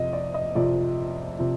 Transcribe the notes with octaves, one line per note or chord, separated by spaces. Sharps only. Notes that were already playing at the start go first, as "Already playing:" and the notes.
Already playing: F2 C3 F3 D#5
D5
D#5
F2 C3 F3 D5
C3 F3